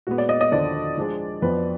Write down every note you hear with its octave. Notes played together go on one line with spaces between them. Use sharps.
A#2 G#3 B3 F#4
D5
D#5
D#5
D#2 D3 F3 D5
F3 G#3 D4 G#4
F2 F3 B3 B4